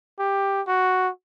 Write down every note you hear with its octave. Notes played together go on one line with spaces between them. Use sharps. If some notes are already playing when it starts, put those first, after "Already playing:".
G4
F#4